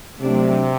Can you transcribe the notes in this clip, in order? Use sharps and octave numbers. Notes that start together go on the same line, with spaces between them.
C3 F#3 A3 D4